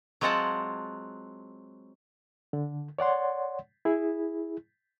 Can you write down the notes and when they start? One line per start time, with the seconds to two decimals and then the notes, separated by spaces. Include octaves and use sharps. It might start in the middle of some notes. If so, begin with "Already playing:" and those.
0.21 F#3 G#3 C4 F4 F#5 A5
2.53 D3
2.99 C#5 D5 F#5 C6
3.85 E4 G#4